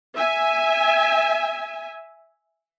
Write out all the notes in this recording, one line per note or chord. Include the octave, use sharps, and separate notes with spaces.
E5 G#5